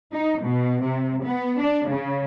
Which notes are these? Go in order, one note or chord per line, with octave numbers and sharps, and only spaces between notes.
D#4
B2
C3
B3
D4
C#3